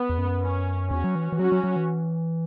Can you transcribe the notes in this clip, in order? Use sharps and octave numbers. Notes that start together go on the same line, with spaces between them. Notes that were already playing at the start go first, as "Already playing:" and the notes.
Already playing: B3
E2
F#2
C#4
E2 C#4 F#4
F#3
E3
E3
F#3 C#4 F#4
F#3
F#3
E3